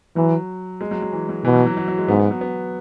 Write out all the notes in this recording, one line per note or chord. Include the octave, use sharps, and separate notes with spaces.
E3 F#3
G#3
F#3
F#3
E3
F#3
B2 E3
F#3
F#3
F#3
F#3
G#3
G#2 B3
B3
F#3
B3